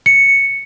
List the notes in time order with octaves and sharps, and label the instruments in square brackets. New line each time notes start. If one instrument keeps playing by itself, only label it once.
[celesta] C#7